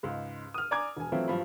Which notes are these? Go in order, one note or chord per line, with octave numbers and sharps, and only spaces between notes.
C#2 G#2
D#6 F6
D5 G#5 A#5 D6 G#6
E1 G#5
E3 F#3 A3 C4 E4 F4
G2 F3 F#3 B5